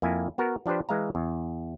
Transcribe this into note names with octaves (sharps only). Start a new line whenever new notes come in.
F2 A#3 E4 G#5
B3 F#4 A#4
F3 D4 G4 B4 C5
E3 G#3 F5 A#5
E2